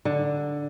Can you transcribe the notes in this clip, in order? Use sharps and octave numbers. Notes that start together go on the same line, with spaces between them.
D3